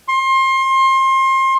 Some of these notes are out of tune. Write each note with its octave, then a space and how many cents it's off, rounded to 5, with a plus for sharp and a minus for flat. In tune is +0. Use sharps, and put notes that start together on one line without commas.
C6 +30